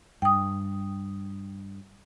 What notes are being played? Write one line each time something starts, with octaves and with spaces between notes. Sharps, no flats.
G2 G5 D#6